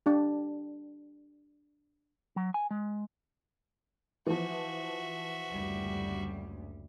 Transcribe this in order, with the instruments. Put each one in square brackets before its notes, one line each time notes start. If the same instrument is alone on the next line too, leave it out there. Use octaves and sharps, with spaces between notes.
[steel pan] D4 G4
[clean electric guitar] F#3
G#5
G#3
[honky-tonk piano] E3 F3 [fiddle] F#4 E5
[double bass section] F#1 D2 [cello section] G3